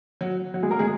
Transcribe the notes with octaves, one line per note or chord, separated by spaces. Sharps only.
F#3 F#4
F#3 F#4
G#3 G#4
A#3 A#4
G#3 G#4